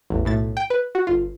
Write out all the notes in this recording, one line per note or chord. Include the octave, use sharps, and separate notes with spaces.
A1 E2
B1 A2 A6
G5
B4
F#4
G1 F4